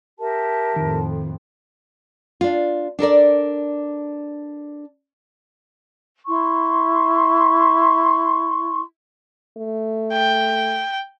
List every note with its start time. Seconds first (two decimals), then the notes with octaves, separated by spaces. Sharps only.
0.19 G4 A#4 E5 A5
0.76 F2 A2 D#3
2.41 D4 F4
2.99 D4 A4 A#4 D5
6.26 E4 C6 C#6
9.57 A3
10.13 G5